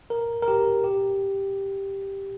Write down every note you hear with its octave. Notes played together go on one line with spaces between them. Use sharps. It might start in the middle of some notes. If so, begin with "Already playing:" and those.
A#4
A#4
G4
G4